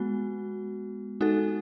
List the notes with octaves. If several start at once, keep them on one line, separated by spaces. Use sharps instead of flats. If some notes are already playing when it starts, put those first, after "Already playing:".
Already playing: G#3 B3 F#4
G#3 D#4 F#4 A4